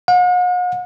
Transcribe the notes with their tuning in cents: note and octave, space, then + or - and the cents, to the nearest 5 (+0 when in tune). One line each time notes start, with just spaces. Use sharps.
F#5 -45